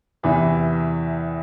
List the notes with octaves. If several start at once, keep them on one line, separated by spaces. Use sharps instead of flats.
E2 C3 E3